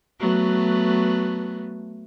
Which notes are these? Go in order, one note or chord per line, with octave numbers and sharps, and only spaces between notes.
F#3 A3 B3